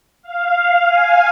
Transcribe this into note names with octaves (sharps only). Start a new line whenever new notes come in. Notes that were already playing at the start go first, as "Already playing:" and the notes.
F5
G#5